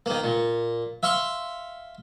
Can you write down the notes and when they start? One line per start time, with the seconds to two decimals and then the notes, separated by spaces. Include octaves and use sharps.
0.06 D#3 A#3
0.24 A#2
1.03 E5 F5 C6 C#6